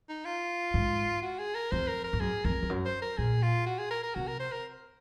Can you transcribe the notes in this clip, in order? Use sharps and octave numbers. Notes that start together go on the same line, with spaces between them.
D#4
F4
G#2
F#4
G#4
A#4
F2 C5
A#4
A#4
G#2
F#2 G#4
F2 A#4
F2
F#2
C5
A#4
A#2 G#4
F4
F#4
G#4
A#4
A#4
C3 F#4
A#4
C5
A#4